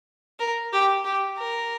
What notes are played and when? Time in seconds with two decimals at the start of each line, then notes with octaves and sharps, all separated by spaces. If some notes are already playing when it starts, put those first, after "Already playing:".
0.40 A#4
0.73 G4
1.04 G4
1.38 A#4